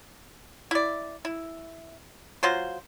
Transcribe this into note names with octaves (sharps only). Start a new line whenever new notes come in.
E4 D5
E4
F#3 F4 C5